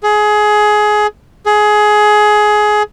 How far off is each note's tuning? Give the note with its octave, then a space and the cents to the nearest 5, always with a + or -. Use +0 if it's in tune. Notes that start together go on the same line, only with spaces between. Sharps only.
G#4 +20
G#4 +20